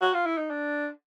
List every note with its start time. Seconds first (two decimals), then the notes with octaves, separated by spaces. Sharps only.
0.01 F#4
0.14 F4
0.26 E4
0.38 D#4
0.50 D4